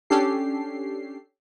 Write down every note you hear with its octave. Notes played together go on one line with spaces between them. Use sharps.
C#4 D4 G4 A4 C7